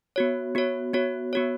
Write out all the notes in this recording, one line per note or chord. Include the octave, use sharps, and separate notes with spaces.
B3 F#4 C#5
B3 F#4 C#5
B3 F#4 C#5
B3 F#4 C#5